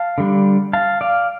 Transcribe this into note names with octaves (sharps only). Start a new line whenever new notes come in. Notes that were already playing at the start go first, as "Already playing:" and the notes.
Already playing: F5 A5
D3 G3 D4
F5 A5
D5 F5